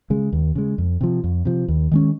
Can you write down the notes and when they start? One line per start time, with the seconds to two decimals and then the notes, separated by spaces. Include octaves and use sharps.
0.10 C#3 G#3
0.33 D#2
0.55 C#3 G#3
0.78 F2
1.01 C3 F3
1.24 F2
1.45 C3 F3
1.68 D#2
1.91 D#3 G#3 C#4